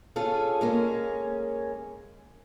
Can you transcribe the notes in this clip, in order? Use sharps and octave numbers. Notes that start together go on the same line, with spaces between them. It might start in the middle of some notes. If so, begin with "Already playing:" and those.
C#4 F4 G#4 A4
G#3 A#3 C#4